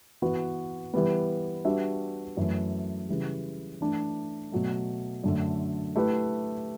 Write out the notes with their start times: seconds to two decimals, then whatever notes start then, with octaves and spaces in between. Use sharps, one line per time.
0.22 E3 B3 F#4 B4
0.94 E3 G3 B3
1.65 G3 D4 F#4 B4 E5
2.37 F#2 E3 A3
3.09 C#3 E3 G3
3.80 E3 A3 D4
4.52 B2 F#3 A3
5.24 F#2 D3 A3
5.96 A3 E4 G4 B4